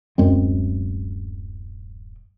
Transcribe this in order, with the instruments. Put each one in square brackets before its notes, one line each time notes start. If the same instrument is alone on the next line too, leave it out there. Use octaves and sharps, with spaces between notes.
[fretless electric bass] D1 F#2 G#3 C4